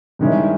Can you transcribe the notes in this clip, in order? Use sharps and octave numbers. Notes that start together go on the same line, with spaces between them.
G2 D#3 G#3 C#4 E4